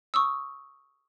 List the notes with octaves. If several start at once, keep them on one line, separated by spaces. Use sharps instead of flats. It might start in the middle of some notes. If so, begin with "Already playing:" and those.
C#6 D#6 E6